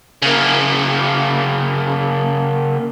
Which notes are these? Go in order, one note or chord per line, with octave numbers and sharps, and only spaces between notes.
C#3 A#3